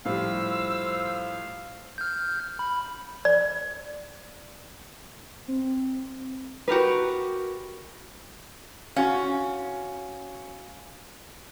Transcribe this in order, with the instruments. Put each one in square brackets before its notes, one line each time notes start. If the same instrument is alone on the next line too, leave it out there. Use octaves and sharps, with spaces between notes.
[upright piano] A2 F3 G3 [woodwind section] C5 [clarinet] F5 [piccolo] E6
[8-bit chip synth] F6 G6
B5
[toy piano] D5
[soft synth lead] C4
[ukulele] F#4 G4 A#4 B4
[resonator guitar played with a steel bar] C#4 [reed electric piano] F#4 F5